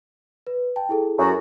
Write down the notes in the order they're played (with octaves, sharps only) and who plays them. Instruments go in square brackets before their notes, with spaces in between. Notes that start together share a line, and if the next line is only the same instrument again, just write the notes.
[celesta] B4
G5 A5
E4 G#4 A4
[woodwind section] F#2 F#4